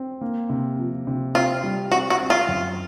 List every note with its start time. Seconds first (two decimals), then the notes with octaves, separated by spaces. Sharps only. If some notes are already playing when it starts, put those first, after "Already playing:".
Already playing: C4
0.21 A#3
0.49 C3
0.79 F3
1.07 C3
1.35 C4 F4
1.63 G3
1.91 C4 F#4
2.10 F#4
2.20 C4
2.30 F4
2.48 F#2